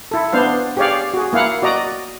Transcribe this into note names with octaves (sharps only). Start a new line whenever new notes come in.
E4 A4
B3 D4 C5 F5
G4 G#4 C#5 D5 F5
F#4 G#4
A#3 E4 F5 F#5
F#4 D5 D#5 A#5